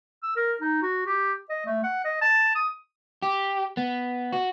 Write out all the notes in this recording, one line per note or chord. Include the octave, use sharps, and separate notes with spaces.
E6
A#4
D#4
F#4
G4
D#5
A3
F#5
D#5
A5
D#6
G4
B3
F#4